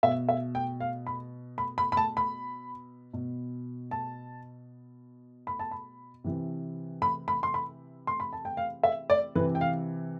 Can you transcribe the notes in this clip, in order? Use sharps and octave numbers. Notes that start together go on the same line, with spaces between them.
B2 E5
E5
G5
F5
B5
B5
B5
B5
A5
B5
B2
A5
B5
A5
B5
C3 E3
B5
B5
C6
B5
C6
B5
A5
G5
F5
E5
D5
C3 E3 B4
G5
F5